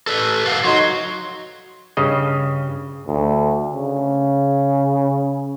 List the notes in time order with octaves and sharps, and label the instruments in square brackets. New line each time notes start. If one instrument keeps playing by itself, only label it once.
[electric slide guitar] A4 B4
A4 F5 F#5
[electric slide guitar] F#3 [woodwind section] D#4 F#4 C6
[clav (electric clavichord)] G2 C#3 D#5
[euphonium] D2
C#3